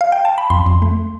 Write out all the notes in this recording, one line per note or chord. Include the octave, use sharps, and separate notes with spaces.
F5
G5
A5
B5
F2 C6
F2
A3